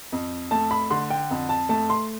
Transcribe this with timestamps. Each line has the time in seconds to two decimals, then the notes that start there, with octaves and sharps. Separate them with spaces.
0.12 F2
0.51 A3 A5
0.71 B5
0.90 D3 C6
1.10 G5
1.31 F2
1.49 A5
1.69 A3 A5
1.90 C6